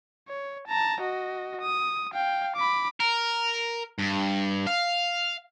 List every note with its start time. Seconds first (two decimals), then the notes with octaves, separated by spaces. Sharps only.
0.28 C#5
0.68 A5 A#5
1.01 F#4 D#5
1.61 D#6
2.13 F5 G5
2.56 B5 D6
3.00 A#4
3.99 G2
4.67 F5